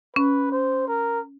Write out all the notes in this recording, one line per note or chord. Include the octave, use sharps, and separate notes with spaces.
C#4 B4
C5
A#4